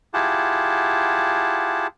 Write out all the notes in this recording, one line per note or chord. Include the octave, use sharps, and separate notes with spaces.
E4 F4 G4 G#4 F#5 A5